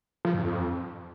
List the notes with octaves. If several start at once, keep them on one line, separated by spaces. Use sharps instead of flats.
F3
G2
F2